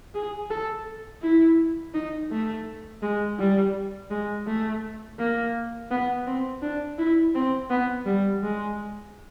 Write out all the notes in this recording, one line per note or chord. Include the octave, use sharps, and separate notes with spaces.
G#4
A4
E4
D#4
A3
G#3
G3
G#3
A3
A#3
B3
C4
D4
E4
C4
B3
G3
G#3